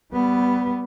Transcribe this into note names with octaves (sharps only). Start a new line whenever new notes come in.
G3 B3